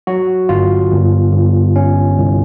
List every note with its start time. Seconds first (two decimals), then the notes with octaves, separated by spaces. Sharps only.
0.07 F#3 F#4
0.49 G1 F4
0.92 G1
1.33 G1
1.76 C#4
2.18 C2